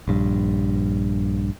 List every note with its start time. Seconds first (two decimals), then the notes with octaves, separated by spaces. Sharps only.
0.08 A#1 G2